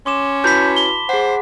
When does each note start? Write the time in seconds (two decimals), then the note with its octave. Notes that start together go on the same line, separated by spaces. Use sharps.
0.06 C#4 C6 D6 E7
0.44 E4 F#4 B4 A5 B5 G6 B6
0.76 G7
1.09 G#4 C5 F#5